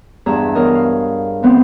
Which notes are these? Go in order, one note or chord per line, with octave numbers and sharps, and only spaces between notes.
E2 G2 G#4 E5 A#5
E3 B3 A#4 C#5 D#5
F5
E3 B3 C4